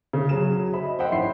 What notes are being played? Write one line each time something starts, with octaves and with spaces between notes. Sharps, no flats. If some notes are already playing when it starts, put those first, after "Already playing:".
C#3
F#3 G#4 C#5 E7
C5 E5 B5
D#5
C5 D#5 E5 F#5 G5 B5
A1 C#5 E5 C6 C7